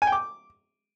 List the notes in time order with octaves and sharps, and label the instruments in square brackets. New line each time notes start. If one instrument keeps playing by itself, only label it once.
[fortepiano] G#5
G5
D6